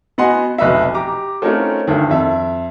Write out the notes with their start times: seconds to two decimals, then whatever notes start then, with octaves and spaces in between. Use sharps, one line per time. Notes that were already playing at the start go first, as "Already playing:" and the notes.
0.18 B3 F#4 D#5 F#5 G#5 C6
0.58 F1 B1 B4 D#5 E5
0.94 G4 A#5 D6
1.42 A3 C4 C#4 D#4 F4 A#4
1.87 D2 G2 D#3
2.09 F2 E5